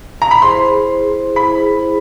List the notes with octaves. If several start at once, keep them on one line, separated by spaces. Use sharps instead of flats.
A#5
B5
E4 G#4 C5 C6
E4 G#4 C5 B5